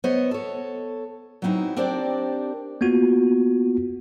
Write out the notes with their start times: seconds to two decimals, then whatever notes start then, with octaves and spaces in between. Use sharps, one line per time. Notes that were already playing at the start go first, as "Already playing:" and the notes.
0.04 B3 C5 C#5 D#5
0.31 A4 C#5
1.42 F#3 B3 C4 D#4 E4
1.77 C4 D4 G4 A#4 C5 D5
2.81 A#3 B3 F4 F#4